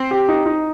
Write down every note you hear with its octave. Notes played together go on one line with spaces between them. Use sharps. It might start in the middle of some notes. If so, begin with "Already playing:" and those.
Already playing: C4
G4
D#4
D#4